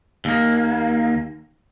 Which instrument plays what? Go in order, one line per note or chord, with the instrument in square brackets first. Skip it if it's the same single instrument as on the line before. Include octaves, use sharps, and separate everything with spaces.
[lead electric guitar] D#2 A#3